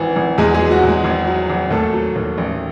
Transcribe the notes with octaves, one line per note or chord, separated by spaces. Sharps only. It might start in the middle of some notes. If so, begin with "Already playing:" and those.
Already playing: G#1 E3
G#1
E2 G#3 G#4
G#3 G#4
F#3
F#3 F#4
E2
G#3 G#4
G#1
F#3
G#1
D#2 A3 A4
F#3
D#2
A1